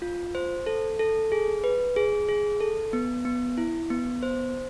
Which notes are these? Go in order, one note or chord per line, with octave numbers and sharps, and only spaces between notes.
F4
C5
A4
A4
G#4
B4
G#4
G#4
A4
B3
B3
E4
B3
C5